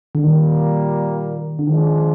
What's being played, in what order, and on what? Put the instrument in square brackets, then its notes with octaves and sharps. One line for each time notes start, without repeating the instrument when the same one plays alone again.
[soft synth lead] D3
[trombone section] A#2 G3 A#3 [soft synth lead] D#3
[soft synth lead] D3
[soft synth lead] D#3 [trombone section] F3 G#3 D4